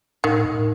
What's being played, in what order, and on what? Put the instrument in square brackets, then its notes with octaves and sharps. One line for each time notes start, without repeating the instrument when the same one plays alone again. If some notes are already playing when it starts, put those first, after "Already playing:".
[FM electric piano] A2 [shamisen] D#3
[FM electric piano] A2